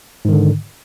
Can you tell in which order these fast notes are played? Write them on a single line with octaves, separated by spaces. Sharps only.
G#2 D#3 D3